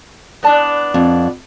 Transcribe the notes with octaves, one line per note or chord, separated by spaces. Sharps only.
B3 D4 E4 D5 A5
F2